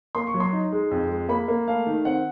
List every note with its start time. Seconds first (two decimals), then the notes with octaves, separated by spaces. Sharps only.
0.15 A#3 C6
0.27 C#6
0.34 F#3
0.40 C6
0.53 D#4
0.72 G#3
0.91 F2
1.10 G#3
1.29 A#3 B5
1.48 A#3
1.68 A3 F5
1.87 D#3
2.05 C4 F#5